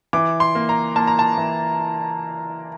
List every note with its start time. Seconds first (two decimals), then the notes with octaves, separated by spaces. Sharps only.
0.13 E3 D6
0.40 C6
0.55 A#3
0.69 A#5
0.96 A#3 A5
1.07 A#5
1.19 A5
1.37 E3